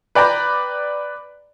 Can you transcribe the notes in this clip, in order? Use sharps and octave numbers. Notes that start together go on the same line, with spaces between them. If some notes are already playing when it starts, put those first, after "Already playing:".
B4 D5 G5 A#5 B5